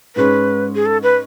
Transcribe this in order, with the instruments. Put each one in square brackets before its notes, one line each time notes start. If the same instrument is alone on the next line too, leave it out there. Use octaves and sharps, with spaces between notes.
[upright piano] G#2 G#3 C#4 [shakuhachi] B4
[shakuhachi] G#4
A4
B4